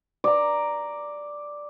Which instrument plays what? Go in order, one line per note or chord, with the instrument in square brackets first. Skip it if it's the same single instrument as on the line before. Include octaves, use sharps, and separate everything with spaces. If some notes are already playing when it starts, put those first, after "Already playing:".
[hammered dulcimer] D5 A#5